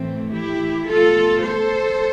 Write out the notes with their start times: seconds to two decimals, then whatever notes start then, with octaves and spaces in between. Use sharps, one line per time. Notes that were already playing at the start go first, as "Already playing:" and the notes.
Already playing: A2 E3 A3 C4
0.33 E4 G4
0.88 B2 A3 F4 A4
1.44 A4 C5